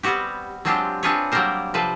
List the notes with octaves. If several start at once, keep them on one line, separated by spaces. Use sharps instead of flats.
G3 B3 C4 F#4 G4
F#3 G#3 C4 D4 F4 G4
C4 D4 F4 G#4 B4 C#5
F#3 G3 A#3 G4 A#4 C5
C3 F3 B4 C5 D5